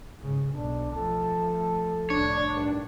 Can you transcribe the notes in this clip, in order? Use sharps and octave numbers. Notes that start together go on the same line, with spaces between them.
G#2 C#3
B1 B2 D4
F3 A3 A4 A5
C2 A2 D4 C#5
G2 D#3